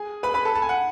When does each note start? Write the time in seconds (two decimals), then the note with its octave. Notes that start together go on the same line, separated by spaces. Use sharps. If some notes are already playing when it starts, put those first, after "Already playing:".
Already playing: G#4 G#5
0.23 B4 B5
0.34 B4 B5
0.45 A4 A5
0.55 A5
0.62 G#5
0.69 F#5